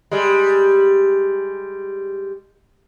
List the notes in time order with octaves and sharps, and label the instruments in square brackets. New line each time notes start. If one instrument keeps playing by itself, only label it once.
[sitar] G3 G#3